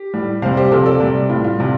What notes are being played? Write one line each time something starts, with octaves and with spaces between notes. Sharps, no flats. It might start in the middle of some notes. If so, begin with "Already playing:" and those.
Already playing: G4
A2 G3
C3 G3 C5 F5
G4 C5
C3 F3 F4 A4
A4 D5
C3 G3
A2 G3 F4
F4
C3 G3